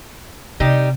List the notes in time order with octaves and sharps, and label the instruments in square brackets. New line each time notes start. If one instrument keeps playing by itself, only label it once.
[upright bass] C3 [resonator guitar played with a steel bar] G3 D#4 G4